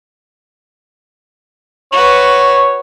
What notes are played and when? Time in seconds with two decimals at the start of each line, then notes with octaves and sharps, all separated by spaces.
1.92 F#4 B4 C#5